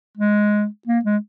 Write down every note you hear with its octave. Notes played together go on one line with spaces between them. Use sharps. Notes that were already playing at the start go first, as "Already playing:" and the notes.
G#3
A#3
G#3